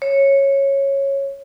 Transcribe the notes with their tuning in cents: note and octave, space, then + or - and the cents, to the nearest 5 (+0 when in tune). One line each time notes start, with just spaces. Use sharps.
C#5 -10